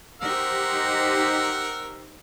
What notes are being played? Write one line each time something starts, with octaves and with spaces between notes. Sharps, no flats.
D#4 G4 A#4 C5 F#5 E6